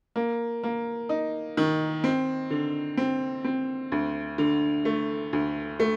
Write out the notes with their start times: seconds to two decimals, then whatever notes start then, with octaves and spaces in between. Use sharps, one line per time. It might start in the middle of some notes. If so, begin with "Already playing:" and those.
0.16 A#3
0.63 A#3
1.09 D#4
1.57 D#3
2.04 C4
2.50 D3
2.97 C4
3.44 C4
3.92 D2
4.38 D3
4.85 A3
5.33 D2
5.80 A3